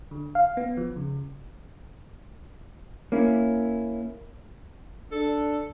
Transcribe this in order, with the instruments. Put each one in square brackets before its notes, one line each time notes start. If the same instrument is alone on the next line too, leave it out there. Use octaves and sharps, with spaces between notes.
[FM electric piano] D3
F5
B3
F3
C#3
[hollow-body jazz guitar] A#3 C#4 E4
[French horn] D4 [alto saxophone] A4